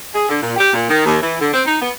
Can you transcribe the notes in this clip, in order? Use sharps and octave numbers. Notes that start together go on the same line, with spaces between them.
G#4
D3
A#2
G4
A#2
D#3
D#2
E3
D3
C4
D#4
B3